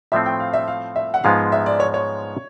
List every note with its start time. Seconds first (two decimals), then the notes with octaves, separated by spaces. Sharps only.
0.12 A2 F3 A3 C4 E5
0.26 G5
0.40 F5
0.53 E5
0.68 F5
0.96 E5
1.14 F#5
1.24 G#2 F3 G#3 B3 F5
1.52 E5
1.66 D5
1.80 C#5
1.94 C#5